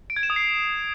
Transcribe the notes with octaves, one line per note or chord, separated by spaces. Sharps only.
D7
G#6
E7
D#6
C7